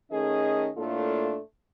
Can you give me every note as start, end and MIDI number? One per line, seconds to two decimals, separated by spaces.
0.12 0.70 51
0.12 0.70 57
0.12 0.70 61
0.12 0.70 68
0.12 0.70 69
0.12 0.70 75
0.77 1.37 45
0.77 1.37 57
0.77 1.37 58
0.77 1.37 62
0.77 1.37 65
0.77 1.37 69